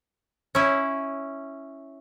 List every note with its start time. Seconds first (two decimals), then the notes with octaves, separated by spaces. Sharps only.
0.55 C#4 E4